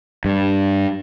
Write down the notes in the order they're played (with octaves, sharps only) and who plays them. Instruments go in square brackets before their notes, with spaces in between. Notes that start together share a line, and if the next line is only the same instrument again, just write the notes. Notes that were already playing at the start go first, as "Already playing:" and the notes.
[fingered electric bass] G2